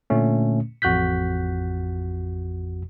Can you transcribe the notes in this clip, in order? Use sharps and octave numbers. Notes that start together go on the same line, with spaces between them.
A#2 D3 A3 C#4
A1 F2 F#4 F#6 G6 B6